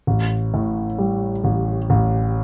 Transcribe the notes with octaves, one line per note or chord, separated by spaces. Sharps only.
A1
A2
G3
A1
A1